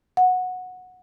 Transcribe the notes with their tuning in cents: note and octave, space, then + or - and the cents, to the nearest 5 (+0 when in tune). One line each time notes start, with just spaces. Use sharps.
F#5 -10